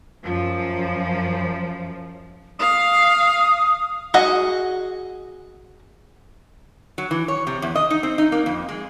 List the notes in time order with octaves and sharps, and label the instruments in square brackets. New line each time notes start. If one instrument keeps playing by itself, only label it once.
[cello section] F#2 F3
[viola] F5 [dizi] D#6
[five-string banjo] F#4 G#4 D#5 F#5
[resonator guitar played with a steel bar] F#3
E3
C#5
C3
E2
D#5
D#4
C4
D#4
A#3
F2
G#3